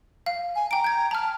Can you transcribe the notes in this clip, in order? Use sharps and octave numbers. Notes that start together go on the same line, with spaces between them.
F5
G#5
G5 A#5 D7
G6 G#6
A5 A#5 F6